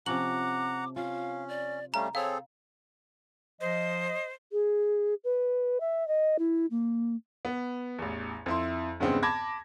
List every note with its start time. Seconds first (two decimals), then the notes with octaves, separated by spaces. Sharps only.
0.06 C3 F3 C#4 F#5 A#5 D6 F#7
0.96 C#4 F4 F5
1.48 D5
1.94 G3 A3 C#4 F5 A#5
2.15 C4 G#4 A4 C#5 F5
3.61 F3 C5 D#5
4.52 G#4
5.24 B4
5.80 E5
6.08 D#5
6.39 E4
6.71 A#3
7.45 B3
7.98 A1 E2
8.46 F2 E4 C6
9.00 E2 G2 C#3 G#3 B3 C4
9.23 A5 B5 D6 G#6 A#6